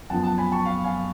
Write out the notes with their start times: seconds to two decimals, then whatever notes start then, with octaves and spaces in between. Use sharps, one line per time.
0.10 F#2 F3 B3 F#5 A5
0.24 F#5 A5
0.38 G#5 B5
0.52 A5 C#6
0.65 F5
0.84 F5 G#5